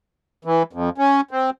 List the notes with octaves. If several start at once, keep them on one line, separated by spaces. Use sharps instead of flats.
E3
F2
C#4
C4